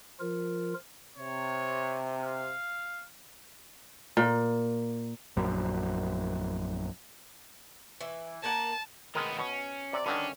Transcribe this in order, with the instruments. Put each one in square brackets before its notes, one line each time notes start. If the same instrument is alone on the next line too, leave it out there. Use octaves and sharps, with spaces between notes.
[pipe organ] F3 F4 A#4
[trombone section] C3 [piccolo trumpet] C#5
[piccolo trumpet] F5
[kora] A#2
[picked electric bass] A#1 F#2
[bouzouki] E3
[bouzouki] A#3 A#4 F#5 [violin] A5
[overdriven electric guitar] D#3 B3 [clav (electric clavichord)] G#3 A#4
[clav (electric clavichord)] B2 [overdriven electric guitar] C#4
[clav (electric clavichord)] C3 [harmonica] D5
[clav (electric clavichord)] G2 D3 D#3 [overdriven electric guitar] C#4 [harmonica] D4